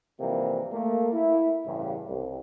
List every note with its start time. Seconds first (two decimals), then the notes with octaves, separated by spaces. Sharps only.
0.20 G#2 C3 E3 F3 G3 A#3
0.72 A3 A#3
1.13 E4
1.65 A1 G2 C#3
2.08 C2